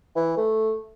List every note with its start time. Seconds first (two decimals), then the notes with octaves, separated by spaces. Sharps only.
0.16 E3
0.37 A3